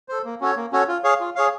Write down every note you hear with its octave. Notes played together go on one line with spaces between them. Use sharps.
A4 C5
A#3
C#4 F#4 A4 C#5
A#3
C#4 F#4 A4 C#5
F4
G#4 C#5 F5
F4
G#4 C#5 F5